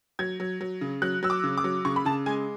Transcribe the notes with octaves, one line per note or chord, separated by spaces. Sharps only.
F#3 G#6
F#3
F#3
C#3
F#3 F#6
F#3 E6
D6
C#3
D6
F#3
C#3 C#6
B5
C#3 A5
G#3 G#5